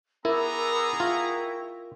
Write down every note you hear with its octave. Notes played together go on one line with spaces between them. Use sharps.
B3 E4 G#4 A#4 A#5 B5 D6 E6
E4 F4 G5 C#6